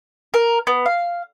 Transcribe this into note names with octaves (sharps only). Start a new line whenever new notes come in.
A#4
B3
F5